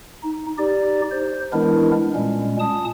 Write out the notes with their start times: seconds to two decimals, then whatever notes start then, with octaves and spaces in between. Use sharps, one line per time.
0.23 D#4
0.58 D#4 G4 D5
1.11 C5
1.53 E3 G#3 B3 D4 E4 A#4
2.15 A#2 G3 G#3 C#4
2.60 A#2 C#4 A5 D#6